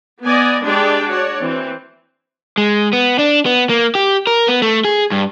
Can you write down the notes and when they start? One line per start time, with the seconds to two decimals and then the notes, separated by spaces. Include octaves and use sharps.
0.24 B3 D5 D#5 G#5
0.64 G#3 D4 G4 D5 G5
1.08 F#4 C#5 D5
1.42 E3 C4
2.58 G#3
2.93 B3
3.19 D4
3.46 B3
3.69 A#3
3.95 G4
4.27 A#4
4.48 B3
4.62 A3
4.85 G#4
5.12 G2